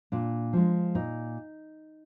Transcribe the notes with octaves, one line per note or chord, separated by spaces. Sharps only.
A#2 D4
F3 G#3
A#2 D#4